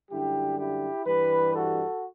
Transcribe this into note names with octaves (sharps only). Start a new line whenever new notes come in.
F#2 D3 G3 E4 G4
E4 G4
G2 E3 G3 G4 B4
F#4 A4